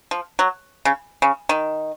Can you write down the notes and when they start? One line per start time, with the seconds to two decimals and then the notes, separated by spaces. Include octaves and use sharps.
0.11 F3
0.39 F#3
0.85 C#3
1.22 C#3
1.49 D#3